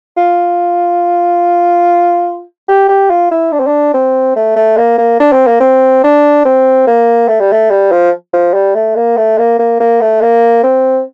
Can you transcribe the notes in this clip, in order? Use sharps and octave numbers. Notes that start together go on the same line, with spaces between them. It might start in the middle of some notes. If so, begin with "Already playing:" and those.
F4
G4
G4
F4
E4
D4
C4
D4
C4
A3
A3
A#3
A#3
D4
C4
A#3
C4
D4
C4
A#3
A3
G3
A3
G3
F3
F3
G3
A3
A#3
A3
A#3
A#3
A#3
A3
A#3
C4